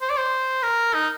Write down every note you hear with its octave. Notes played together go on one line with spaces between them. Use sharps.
C5
D5
C5
A#4
D#4